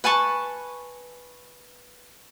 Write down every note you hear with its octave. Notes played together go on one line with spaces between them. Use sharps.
B4 G#5 A5 C#6